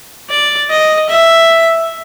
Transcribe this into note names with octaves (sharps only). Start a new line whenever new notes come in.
D5
D#5
E5